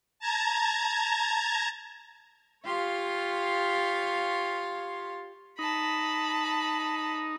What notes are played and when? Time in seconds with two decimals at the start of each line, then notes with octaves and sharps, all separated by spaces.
0.19 A5 A#5 G#6
2.64 F4 G4 C#5 F5 C6
5.59 D#4 A5 B5